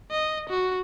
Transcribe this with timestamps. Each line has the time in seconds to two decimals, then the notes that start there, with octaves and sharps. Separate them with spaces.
0.11 D#5
0.50 F#4